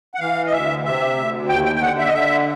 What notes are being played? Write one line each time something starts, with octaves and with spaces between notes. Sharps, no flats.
F#5
E3 F5
D#5
D2 E5
C3 E5
D2
D#2 G5
G5
G5
D3 F#5
E5
D#5
D3 E5